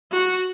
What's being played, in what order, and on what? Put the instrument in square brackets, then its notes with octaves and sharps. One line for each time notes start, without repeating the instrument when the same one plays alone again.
[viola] F#4